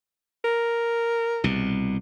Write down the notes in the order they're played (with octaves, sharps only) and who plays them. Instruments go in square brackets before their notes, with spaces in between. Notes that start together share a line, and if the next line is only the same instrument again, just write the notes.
[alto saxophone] A#4
[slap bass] C2 B2